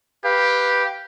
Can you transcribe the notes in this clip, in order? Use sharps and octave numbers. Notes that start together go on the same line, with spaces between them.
G4 B4 F5